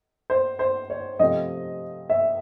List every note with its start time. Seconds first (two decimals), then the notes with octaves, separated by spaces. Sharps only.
0.30 C5
0.59 C5
0.90 C#5
1.19 C3 F3 A3 C4 D#5
2.10 E5